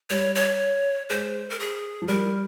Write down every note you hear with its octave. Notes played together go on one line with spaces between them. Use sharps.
G3 C#5
C#5
G#3 C5
A#4
G#4
F3
G3 A#4